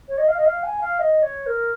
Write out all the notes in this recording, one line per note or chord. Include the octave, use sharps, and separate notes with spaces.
C#5
D#5
F5
D#5
F5
G#5
F5
D#5
C#5
A#4